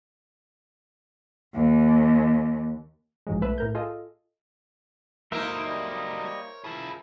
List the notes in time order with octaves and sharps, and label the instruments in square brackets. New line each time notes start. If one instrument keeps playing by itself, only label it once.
[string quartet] D#2
[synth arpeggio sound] A1 G#2 F3 F#3 G#3
B1 A3 B4 E5
A2 A#4 G6
F4 G#4 A4 D#5
[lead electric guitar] F#3 A4 [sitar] A#3 D#4 [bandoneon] E4 [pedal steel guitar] A#4 C5 E5
[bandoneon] G3 D#5
[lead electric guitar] C#5
[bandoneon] E4 A5 B5 [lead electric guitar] F4 G#4